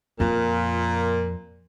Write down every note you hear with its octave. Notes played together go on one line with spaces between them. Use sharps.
F2 A#2